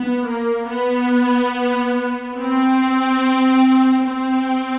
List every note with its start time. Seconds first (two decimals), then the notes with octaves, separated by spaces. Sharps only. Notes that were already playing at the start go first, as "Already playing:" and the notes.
Already playing: B3
0.25 A#3
0.67 B3
2.36 C4
4.06 C4